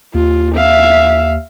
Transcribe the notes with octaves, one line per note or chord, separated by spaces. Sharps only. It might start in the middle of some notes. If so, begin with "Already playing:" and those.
D#2 F4
E5 F5